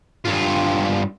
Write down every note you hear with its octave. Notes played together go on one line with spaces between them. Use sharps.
G2 F4